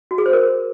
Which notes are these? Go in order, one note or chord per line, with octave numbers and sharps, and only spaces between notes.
F#4
G#4
C5
A#4